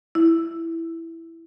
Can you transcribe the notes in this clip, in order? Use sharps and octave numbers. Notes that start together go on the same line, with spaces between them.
E4